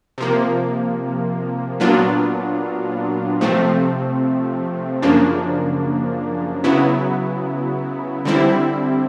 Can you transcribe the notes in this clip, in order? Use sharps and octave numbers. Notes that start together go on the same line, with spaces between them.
C3 F3 A#3
A#2 F#3 B3 D4 F4
C3 F3 A3 C4
F#2 C#3 F3 A#3 D4
C#3 F#3 B3 E4
D3 G3 C4 E4